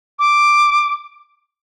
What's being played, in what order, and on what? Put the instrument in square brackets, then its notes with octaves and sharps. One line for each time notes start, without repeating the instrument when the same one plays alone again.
[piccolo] D6